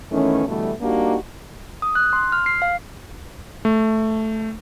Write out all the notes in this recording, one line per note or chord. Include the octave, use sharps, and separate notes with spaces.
D#3 E3 A3 B3 C#4
B2 D3 E3 G3 A3
G3 A#3 D4 D#4 F#4 G4
D#6
F#6
C6
F6
C7
F5
A3